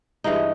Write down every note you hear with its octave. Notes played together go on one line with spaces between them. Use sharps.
G2 E3 G#3 D#4